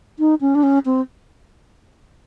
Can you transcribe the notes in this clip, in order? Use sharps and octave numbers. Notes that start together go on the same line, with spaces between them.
D#4
C#4
D4
C#4
C4